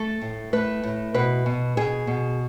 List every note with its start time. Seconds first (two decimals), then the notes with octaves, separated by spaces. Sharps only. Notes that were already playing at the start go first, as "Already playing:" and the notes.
Already playing: A3 A4
0.22 A2
0.53 A3 B4
0.84 A2
1.14 B2 B4
1.46 B2
1.77 B2 G#4
2.07 B2